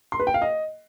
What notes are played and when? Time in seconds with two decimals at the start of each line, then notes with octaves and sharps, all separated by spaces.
0.12 C6
0.20 B4
0.27 G5
0.34 F5
0.42 D#5